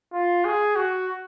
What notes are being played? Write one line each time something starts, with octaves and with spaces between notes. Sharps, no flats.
F4
G#4
F#4